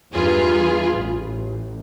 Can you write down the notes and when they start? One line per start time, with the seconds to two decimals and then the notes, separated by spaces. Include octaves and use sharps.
0.12 E2 G2 F4 G#4 B4
0.92 A1